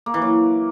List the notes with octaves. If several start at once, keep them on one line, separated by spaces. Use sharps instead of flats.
A#3
E3
F#3